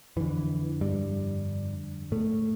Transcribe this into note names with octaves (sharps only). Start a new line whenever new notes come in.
F2 D3 E3
G2 G3
A2 A3